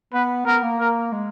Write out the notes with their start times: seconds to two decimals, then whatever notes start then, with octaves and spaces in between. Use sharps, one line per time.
0.14 B3 B4
0.47 B3 A#4
0.63 A#3
0.79 A#4
1.12 G#3